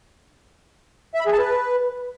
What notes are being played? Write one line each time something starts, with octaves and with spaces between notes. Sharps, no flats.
E5
B5
G#4
A5
B4